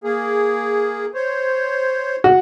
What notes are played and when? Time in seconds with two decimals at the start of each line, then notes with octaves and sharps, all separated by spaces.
0.04 A#3 G#4
1.14 C5 C#5
2.24 F#4